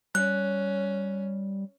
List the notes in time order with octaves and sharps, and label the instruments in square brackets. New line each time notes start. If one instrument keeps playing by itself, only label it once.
[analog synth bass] G3 [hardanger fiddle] C#4 [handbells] F#6